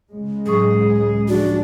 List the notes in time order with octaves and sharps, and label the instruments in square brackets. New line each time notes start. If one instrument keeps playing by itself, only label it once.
[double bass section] C#2 C#3 G#3
[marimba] A2 F#3 C#6 [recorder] G#4
[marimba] F3 [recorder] D4 [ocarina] F#4